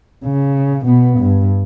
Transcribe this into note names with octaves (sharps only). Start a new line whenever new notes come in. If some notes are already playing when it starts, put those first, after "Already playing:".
C#3
B2 B3
G2